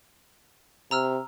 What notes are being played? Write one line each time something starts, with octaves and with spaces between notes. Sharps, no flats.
C3 A#5 E6 F6